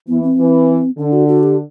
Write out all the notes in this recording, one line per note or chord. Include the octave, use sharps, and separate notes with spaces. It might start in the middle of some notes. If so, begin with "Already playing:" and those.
E3 B3
C4
E3
D3 D4
F#4
F#4
G4